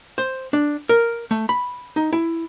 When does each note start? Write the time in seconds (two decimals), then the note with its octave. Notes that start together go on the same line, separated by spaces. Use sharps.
0.18 C5
0.53 D4
0.89 A#4
1.31 A3
1.49 B5
1.96 D#4
2.13 E4